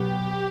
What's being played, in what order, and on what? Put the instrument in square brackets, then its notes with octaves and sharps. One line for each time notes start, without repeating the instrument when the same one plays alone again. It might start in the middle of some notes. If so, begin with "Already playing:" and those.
Already playing: [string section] B2 F#3 B3 G4